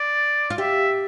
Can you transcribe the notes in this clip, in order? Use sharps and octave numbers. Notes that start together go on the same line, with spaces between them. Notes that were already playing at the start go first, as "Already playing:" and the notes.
Already playing: D5
F4
G4 E5